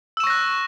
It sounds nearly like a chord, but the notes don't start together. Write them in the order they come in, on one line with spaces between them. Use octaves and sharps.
E6 E7 C#6 A#6 F#6